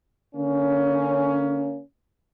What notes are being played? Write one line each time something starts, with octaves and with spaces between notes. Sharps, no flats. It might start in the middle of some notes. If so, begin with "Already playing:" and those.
D3 A#3 C#4